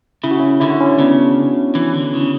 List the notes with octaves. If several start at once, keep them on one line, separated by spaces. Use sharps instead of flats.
C#3 E4
F#4
C#4 E4
D3 E4
F#4
C#4 E4
C#3 B3 D4
E3
D3
C#3